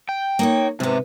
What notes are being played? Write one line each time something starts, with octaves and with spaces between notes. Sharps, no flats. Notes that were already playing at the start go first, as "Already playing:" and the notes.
G5
A#3 D#4 C#5
G#2 C3 B3